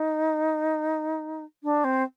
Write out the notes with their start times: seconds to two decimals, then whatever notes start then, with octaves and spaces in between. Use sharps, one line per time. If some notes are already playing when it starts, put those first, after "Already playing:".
Already playing: D#4
1.63 D4
1.84 C4